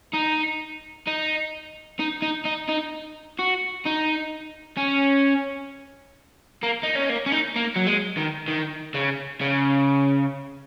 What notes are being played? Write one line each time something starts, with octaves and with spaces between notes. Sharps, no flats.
D#4
D#4
D#4
D#4
D#4
D#4
F#4
D#4
C#4
A#3
D#4
C#4
A#3
C#4
D#4
A#3
F#3
G#3
D#3
D#3
C#3
C#3